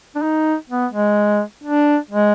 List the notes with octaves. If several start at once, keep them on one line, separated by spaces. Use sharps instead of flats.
D4
D#4
B3
G#3
D4
G#3